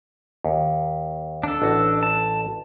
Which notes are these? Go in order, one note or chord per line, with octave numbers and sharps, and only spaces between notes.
D#2
D4 A4
A1 F#4
A5